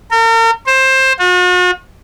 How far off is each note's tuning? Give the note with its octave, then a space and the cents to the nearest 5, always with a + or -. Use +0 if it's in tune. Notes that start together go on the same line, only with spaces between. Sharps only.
A#4 -40
C5 +15
F#4 -45